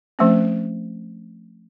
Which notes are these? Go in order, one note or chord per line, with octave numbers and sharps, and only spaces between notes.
F3 A3 C4 C#4